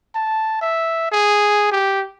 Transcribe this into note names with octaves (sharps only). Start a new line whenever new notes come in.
A5
E5
G#4
G4